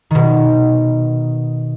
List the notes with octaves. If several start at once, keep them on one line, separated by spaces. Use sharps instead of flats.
B2 D#3